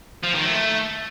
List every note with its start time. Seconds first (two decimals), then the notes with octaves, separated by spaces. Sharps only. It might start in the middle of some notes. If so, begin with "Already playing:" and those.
0.24 F3
0.35 D#3
0.46 A3